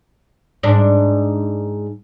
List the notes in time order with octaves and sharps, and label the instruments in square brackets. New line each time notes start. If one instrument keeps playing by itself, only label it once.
[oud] G#2 D4